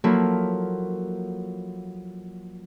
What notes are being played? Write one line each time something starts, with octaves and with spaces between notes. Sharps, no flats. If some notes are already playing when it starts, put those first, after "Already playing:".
F3 F#3 A#3 E4 A4